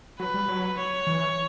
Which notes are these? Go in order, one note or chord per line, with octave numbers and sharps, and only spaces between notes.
F#3 B4
G3
F#3
C#5
E3